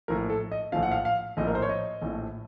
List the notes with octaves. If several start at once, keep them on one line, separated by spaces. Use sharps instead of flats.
A#1 A2 F3 A#4
A4
D#5
A#1 A2 F3 F5
F#5
F5
F5
A#1 A2 F3 D#5
A#4
C5
C#5
D#5
A#1 A2 F3